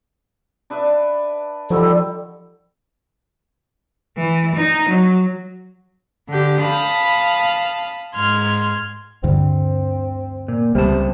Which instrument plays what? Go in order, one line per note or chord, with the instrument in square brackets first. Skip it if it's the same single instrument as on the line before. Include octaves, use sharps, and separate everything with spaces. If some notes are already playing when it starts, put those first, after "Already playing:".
[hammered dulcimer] D4 B4 E5
[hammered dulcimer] D3 D#3 G3 [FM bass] F3 [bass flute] A4
[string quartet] E3
D#4
F#3
D3 G4
F5 A5 B5 D#6
G#2 C6 F6 G#6
[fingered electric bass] D2 G2 D3 [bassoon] C4
[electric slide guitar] A#2
[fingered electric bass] C#2 [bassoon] C3 [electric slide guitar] G3 B3 A5